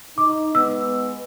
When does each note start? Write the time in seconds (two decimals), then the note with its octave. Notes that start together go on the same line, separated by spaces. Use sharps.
0.18 D#4 D6
0.55 G#3 B3 E6